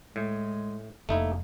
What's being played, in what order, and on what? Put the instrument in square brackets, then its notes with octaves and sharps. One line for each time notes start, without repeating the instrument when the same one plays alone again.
[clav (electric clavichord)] A2 [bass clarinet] G#3
[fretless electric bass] F1 [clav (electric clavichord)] A3 D#4 E4 [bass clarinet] A#3